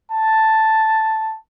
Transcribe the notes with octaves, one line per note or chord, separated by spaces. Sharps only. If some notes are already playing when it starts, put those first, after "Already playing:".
A5